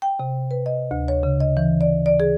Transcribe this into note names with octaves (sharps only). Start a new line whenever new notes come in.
G5
C3
B4
D#5
D2
C#5
C#3
D#5
E3
D5
D5
G#4